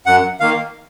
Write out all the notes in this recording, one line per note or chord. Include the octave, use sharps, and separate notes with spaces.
F#2 F#5
D#3 A#3 F5